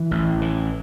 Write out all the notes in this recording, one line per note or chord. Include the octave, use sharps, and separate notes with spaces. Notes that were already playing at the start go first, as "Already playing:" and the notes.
Already playing: E3
A1
E3